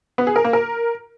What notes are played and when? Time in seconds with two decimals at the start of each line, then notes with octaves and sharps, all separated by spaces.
0.18 B3
0.27 G#4
0.36 A#4
0.45 A#3
0.53 A#4